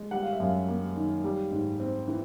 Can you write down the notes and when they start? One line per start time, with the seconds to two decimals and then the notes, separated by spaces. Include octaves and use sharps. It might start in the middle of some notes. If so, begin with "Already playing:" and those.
Already playing: G#3
0.11 G3 F#5
0.23 F5
0.33 E5
0.40 F#2 F5
0.68 A#3
0.96 D#3
1.24 G3
1.52 G#2
1.80 C4
2.08 E3